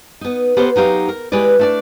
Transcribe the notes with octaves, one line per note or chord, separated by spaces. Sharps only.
B3 D#4
B3 G4 A4 A#4 C5
F#3 D#4 G4 F5
A#4
G#3 E4 G4 B4 D5
A3 D4 D5